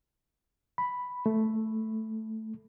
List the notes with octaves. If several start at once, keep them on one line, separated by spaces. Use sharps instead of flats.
B5
A3